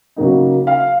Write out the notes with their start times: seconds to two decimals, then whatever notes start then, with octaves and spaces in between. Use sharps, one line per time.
0.16 C#3 F#3 A#3 D#4
0.67 F5